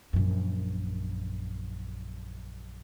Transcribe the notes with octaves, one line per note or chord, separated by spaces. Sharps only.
A#1 F#2